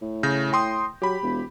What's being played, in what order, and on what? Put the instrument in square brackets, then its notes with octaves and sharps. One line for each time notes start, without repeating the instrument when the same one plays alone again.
[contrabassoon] A2
[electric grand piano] C#3 G6 A#6
G5 C6 D#6
[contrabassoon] F#3 [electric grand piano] G4 B5
[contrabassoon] E1